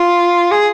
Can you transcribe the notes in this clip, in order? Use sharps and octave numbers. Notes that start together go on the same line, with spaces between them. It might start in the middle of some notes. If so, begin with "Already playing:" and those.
Already playing: F4
G#4